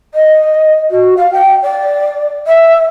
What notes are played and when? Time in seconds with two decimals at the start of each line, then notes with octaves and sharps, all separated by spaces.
0.14 D#5
0.90 F#4
1.16 F5
1.31 G5
1.62 D5
2.46 E5